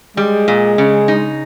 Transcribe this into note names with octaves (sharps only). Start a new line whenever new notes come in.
G3 G#3
A#2
C#3
D#4